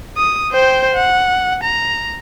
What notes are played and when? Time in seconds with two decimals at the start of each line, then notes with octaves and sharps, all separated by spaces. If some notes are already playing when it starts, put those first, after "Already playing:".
0.17 D#6
0.52 C5 G5
0.95 F#5
1.63 A#5